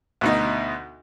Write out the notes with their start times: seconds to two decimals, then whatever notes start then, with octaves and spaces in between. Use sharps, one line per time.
0.21 D2 B2 D#4